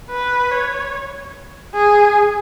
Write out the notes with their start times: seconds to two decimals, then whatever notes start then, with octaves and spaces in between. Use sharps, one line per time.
0.11 B4
0.51 C#5
1.74 G#4